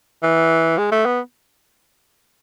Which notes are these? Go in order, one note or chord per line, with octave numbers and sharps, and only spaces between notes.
E3
G#3
A3
B3